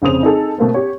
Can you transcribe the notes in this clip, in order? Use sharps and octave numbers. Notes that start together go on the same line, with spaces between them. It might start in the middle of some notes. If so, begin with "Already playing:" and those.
F1 C#3 C4 D#6 F7
D#4 G#4 A4
B2 A3 A#3 C4
G4 C#5